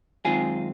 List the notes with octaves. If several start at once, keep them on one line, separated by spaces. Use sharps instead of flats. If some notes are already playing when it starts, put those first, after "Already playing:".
F#2 D#3 G#3 C4 F4 G#4